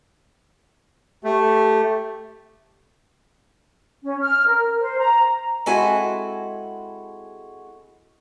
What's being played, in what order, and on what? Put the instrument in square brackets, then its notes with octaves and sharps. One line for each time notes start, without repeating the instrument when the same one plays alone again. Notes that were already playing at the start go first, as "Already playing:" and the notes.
[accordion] A3 [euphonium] G4
[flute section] C#4
F6
A#4
C5
A#5
[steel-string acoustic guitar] G#3 C4 E4 F#4 A4 G#5